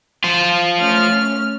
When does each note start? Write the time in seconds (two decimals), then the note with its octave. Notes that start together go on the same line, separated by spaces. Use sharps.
0.24 F4 C5
0.78 A3 C#4 F6